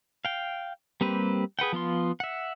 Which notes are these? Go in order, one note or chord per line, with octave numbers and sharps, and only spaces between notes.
F5 G5
G3 A#3 C4 G4 B4
G#4 B4 F#5 G5
F3 B3 F4 C6
E5 F#5